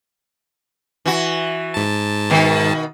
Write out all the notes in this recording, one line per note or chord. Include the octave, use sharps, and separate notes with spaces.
E3 F#4
G#2 A5
B2 D#3